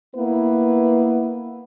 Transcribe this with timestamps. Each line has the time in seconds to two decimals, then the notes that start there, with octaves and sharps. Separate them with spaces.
0.16 A#3 B3 E4 B4